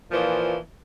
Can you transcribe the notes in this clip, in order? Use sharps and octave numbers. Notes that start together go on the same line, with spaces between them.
A#2 E3 F3